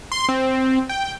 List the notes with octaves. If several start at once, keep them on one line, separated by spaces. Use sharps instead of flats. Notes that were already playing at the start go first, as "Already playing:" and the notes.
C6
C4
G5